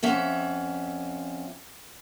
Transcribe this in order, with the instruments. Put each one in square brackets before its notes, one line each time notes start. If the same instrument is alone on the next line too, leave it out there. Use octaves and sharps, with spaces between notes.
[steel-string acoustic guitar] F2 C#4 E5 F#5